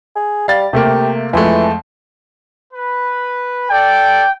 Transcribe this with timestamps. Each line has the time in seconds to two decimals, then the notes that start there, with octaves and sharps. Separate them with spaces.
0.16 G#4
0.48 G3 F5 A6
0.73 C3 A3 A#3 G4
1.33 F2 E3 G#3 A3
2.73 B4
3.70 A4 D5 G5